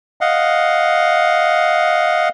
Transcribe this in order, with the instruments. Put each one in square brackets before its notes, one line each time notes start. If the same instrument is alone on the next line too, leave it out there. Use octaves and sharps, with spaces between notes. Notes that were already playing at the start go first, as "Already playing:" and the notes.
[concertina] D#5 F5 F#5